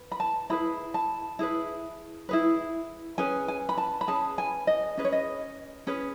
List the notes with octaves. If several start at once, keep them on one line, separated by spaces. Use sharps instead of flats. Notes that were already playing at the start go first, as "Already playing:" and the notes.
Already playing: B4
B5
A5
E4 G#4 B4 B5
A5
E4 G#4 B4
E4 G#4 B4
C#4 G#4 B4 G#5
G#5
B5
A5
B5
C#4 G#4 B4 A5
G#5
D#5
C#4 G#4 B4 D#5
C#5
D#5
C#4 G#4 B4